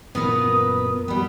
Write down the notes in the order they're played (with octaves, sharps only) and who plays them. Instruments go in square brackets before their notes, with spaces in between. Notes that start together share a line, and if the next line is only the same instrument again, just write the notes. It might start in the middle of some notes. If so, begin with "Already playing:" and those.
[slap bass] F#2 A#2 [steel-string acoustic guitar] B3 A#4 B4 [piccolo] D#6
[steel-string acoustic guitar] G3 B3 [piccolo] B5